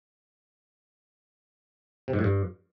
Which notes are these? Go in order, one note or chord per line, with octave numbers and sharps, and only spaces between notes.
C3
G#2
A2
G2